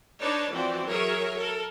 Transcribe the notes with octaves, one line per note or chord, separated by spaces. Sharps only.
D4 D#4 B4 C#5 D5 A5
E3 F3 C4 F#4 D5
F#3 G#4 A#4 C#5 E5
A4 A#4